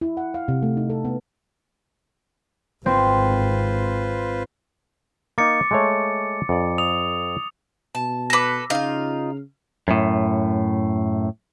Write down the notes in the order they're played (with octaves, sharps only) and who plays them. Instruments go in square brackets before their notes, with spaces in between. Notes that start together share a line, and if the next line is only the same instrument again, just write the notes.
[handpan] E4
F#5
F5
C3
A3
D#4
A4
B3
[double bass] G#1 [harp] C4 [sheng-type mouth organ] F4 B4 C5
[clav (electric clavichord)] A#3 D#4 [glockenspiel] D6 A6 C#7
[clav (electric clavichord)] G#3 A3 C#5
F2 D5
[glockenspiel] D#6 F7
[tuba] B2 [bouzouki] A5
[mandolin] A4 B4 [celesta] D6 A#6
[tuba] C#3 [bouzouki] D#4 F4 [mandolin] F5
[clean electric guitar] F#2 A2